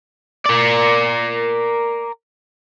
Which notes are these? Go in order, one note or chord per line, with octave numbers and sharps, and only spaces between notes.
A#4 D5